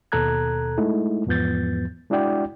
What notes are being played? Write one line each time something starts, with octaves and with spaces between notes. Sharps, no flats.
D#2 B2 A4 A#5 F#6 G#6
G#3 A3 D#4 E4
E2 G#2 F3 B3 G6 A6
G#3 D4 E4 F#4 D5 G5